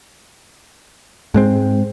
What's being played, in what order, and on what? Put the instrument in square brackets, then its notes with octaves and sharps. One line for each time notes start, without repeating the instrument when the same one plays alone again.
[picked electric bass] G#2 G#3 C4